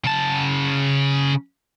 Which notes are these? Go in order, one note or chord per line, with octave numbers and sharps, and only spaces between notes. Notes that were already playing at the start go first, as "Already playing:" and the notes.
C#3 A5